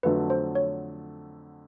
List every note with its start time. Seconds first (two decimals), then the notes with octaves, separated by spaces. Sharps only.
0.03 F2 D3 F#3 A3 B4
0.30 C5
0.55 C#5